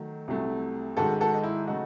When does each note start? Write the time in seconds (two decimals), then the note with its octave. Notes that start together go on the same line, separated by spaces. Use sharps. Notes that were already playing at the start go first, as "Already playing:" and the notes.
Already playing: D#3 F#3 A3
0.28 C2 C3 F#3 A3
0.97 G#2 D#3 G#3 F#4 A4
1.21 F#4 A4
1.34 D#4
1.43 E4
1.67 C#3 F#3 A3 D#4 F#4